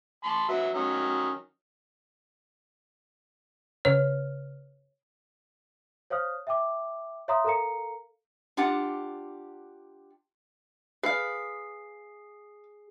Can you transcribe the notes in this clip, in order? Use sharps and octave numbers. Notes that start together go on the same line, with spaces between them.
A5 B5 C6
F#3 B4 E5
D#3 F#3 C#4
C#3 B4 C#5 F6
C5 C#5 F5 D#6 F6
E5 G5 D6
C#5 E5 F5 A#5 C6 D#6
A4 A#4 F5 A#5 C#7
D4 F4 G4 F#5
G#4 B4 F5 C7